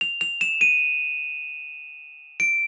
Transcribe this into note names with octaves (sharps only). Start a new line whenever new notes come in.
F7
F7
E7
D#7
D7